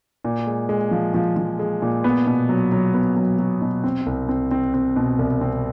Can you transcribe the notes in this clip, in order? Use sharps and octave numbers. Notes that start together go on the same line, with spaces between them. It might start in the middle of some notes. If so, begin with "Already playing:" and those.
A#2
G#3
G#3
F3
F3
F3
G#3
A#2
B3
B2
F#3
F#3
B3
F#3
F#3
B2
C4
C2
C4
C4
C4
B2
C2
C4